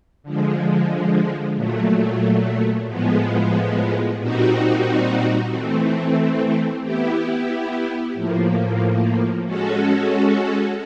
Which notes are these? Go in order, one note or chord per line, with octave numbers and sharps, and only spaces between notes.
D3 F3 G#3
A#2 F#3 A3
A2 F3 G#3 B3
A#2 G3 C4 D#4 F#4
E3 A3 C4
B3 E4 G4
A2 F3 A#3
G#3 C#4 F#4 A4